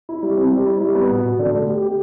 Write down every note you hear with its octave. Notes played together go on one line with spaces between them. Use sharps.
E4
G3
C4
G3
E4
G3
B3
B2
B2
D3
A3
G4
G4